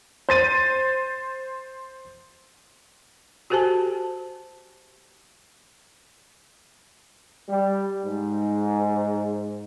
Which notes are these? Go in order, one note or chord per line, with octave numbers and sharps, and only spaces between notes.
C5 A6 D#7
F#4 G4 A4 C5 G#5 A5
G3
G#2